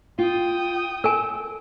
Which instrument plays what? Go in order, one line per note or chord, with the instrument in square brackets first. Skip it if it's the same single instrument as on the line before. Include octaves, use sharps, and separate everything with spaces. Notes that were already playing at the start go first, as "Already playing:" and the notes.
[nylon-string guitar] F4 [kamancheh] G5 D#6
[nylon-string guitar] A4 [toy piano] A#4 G#5